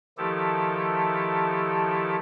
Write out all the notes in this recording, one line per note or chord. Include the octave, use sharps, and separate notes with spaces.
D#3 F3 A3 E4 G4 A4